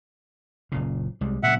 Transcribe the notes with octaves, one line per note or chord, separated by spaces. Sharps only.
F#1 A#2 C#3
C2 G3 G#3
A#2 C#3 F#3 E5 F#5